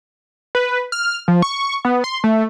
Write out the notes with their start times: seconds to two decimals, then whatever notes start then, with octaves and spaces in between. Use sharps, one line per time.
0.55 B4
0.92 F6
1.28 F3
1.42 C#6
1.85 B3
2.04 C6
2.24 A3